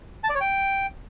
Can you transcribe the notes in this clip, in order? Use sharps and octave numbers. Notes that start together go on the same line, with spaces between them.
A5
D5
C#5
G5